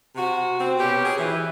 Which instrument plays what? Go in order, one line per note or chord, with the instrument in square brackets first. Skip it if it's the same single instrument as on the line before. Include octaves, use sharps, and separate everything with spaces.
[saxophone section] C3 F#4
C4
B2 C#4 G4
G#4
E3